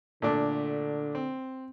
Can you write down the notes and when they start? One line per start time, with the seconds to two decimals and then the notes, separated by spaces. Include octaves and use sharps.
0.22 A#2 D3 A3 D4
1.15 C4